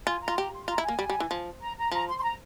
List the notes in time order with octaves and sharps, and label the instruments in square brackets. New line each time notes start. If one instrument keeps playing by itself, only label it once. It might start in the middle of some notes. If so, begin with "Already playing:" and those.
[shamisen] F4 [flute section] G#5
[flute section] A#5
[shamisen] F4
[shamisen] G4 [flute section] A#5
[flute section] C6
[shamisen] F4 [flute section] A#5
[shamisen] E4
[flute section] G#5
[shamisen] A#3
G3
G3
E3
F3
[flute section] A#5
A#5
[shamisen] F3 [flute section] A#5
[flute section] C6
C6
A#5